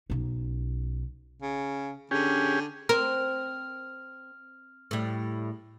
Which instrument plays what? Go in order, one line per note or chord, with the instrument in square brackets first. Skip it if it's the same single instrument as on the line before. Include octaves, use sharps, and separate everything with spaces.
[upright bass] B1 C#4
[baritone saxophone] C#3
[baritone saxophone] D3 [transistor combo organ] C#4 G4 G#4
[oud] C4 [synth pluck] A#4 [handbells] F6
[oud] A2 G3